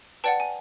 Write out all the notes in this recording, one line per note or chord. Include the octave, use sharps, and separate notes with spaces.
B4 D5 F#5 G5 A5
G#5